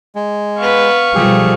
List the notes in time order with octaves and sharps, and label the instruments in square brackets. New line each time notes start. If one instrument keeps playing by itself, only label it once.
[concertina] G#3
[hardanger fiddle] B3 B4 [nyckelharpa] F5 C#6
[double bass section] B2 F3 G3 [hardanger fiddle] A3 [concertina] G4 G#4